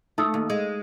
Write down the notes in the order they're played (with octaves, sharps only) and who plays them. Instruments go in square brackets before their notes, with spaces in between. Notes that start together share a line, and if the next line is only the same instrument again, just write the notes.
[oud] A3 [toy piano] D#4 D#6 E6
[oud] D#2
G#3